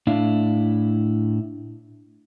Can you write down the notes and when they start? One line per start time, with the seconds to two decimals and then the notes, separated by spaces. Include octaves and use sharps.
0.07 A2 D4 E4 F5